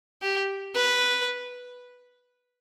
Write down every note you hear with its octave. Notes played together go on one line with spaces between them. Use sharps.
G4
B4